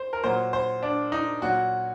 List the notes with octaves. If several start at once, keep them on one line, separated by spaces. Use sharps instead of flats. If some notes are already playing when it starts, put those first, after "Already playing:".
Already playing: C5
A#4
A#2 F#3 C5
C5
D4
D#4
A#2 F#3 F#4